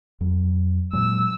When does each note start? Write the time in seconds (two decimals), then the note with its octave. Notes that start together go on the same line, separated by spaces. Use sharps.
0.21 F2 F#3
0.93 A#2 F#3 G#3 E6